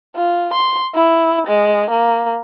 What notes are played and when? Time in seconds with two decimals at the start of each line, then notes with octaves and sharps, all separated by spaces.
0.16 F4
0.54 C6
0.95 E4
1.47 G#3
1.90 A#3